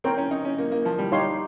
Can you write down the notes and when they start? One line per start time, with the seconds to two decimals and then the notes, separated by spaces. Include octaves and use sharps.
0.04 C4 A#4 C#5 G5
0.18 C#4
0.31 D#4
0.45 C#4
0.58 A#3
0.72 A#3
0.85 F3
0.98 G3
1.12 D#4 G4 C#5 F5 C6